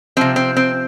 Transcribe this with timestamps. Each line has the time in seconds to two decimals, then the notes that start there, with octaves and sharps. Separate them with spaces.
0.17 C3 F3 C4
0.36 C4
0.57 C4